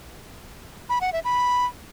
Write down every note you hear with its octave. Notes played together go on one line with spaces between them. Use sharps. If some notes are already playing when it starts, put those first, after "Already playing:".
B5
F#5
E5
B5